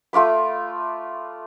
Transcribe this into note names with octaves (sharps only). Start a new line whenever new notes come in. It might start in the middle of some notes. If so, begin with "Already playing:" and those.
A3 F4 D5 B5